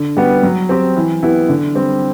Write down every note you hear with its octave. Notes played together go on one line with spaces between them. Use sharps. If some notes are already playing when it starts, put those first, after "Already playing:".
Already playing: D3
G3 B3 F#4
F#3
C4 G4
E3
B3 E4 G4
D3
G3 C4